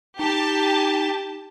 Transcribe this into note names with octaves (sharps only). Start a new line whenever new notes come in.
D#4 G4 A5